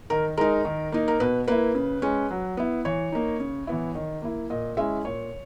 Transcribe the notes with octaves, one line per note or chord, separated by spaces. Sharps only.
D#3 A#4
G#3 D#4 A#4
D#3
A#3 D#4
A#4
B2 B4
A#3 E4 B4
C#3
G#3 C#4
F#3
B3 E4
E3 C#5
A#3 D#4
C#3
E3 B3 E4
D#3
A#3 E4
A#2 D#5
G#3 C#4 E4 E5
A#2 C#5